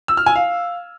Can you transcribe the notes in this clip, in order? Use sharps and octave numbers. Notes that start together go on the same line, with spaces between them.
E6
F6
G#5
F5